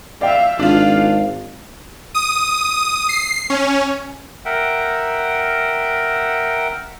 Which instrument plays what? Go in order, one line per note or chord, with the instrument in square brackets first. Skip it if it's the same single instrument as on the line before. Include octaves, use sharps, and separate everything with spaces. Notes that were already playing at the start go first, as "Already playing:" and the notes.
[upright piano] D5 G5 [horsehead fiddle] E5 F5
[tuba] G#1 [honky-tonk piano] D4 F4 [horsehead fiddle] F5
[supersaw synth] D#6
C7
C#4
[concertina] A#4 E5 F#5 G5